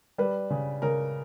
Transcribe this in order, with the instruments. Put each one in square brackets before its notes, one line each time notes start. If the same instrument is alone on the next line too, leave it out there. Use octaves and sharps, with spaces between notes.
[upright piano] G3 B4
C#3
C#3 A#4